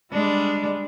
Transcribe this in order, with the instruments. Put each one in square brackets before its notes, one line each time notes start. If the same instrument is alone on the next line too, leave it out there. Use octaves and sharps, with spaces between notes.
[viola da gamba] G3 G#3 D4